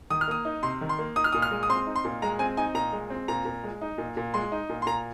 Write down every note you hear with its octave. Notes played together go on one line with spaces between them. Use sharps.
D#3 D#6
F6
A#3 D#6
D#4
C3 C6
D#3
C6
A#3
D#4 D#6
F6
A#2 D#6
F6
G#3
D#6
C4 C6
D#4
C6
A#2
G#3 A#5
C4 G#5
D#4 G#5
A#2 A#5
G#3
C4
A#2 A#5
A#2
G#3
D#4
A#2
A#2
G#3 C6
D#4
A#2
C6
A#2 A#5